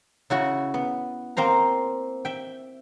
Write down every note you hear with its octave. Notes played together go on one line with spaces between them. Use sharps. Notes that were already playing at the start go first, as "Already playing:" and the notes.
C#3 E4 F#4
B3
A#3 C4 C5 A#5
E5 G5